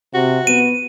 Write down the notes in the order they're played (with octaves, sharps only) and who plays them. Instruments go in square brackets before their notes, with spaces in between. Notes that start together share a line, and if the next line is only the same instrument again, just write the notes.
[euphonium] C3 [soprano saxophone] F#4
[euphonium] B3 [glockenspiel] D#7